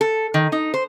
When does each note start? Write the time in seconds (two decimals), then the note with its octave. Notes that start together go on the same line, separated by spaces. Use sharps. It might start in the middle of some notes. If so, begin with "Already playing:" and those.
0.01 A4
0.34 D#3
0.52 D#4
0.74 C5